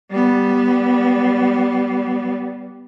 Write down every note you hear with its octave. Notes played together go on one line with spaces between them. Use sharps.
G3 B3